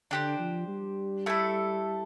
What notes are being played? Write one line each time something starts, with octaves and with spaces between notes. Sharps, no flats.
D3 D4 G4 C5
F3
G3
A3 E4 A4